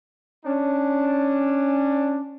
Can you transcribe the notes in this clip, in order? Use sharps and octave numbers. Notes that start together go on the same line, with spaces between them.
C#4 D4